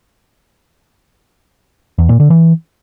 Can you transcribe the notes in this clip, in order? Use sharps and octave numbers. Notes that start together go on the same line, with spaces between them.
E2
A#2
D3
E3